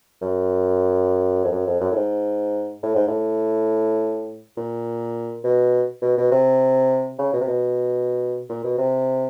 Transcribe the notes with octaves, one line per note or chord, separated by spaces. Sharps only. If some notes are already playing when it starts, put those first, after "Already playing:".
F#2
F2
F#2
F2
F#2
A2
G#2
A2
G#2
A2
A#2
B2
B2
B2
C3
C#3
B2
C3
B2
A#2
B2
C3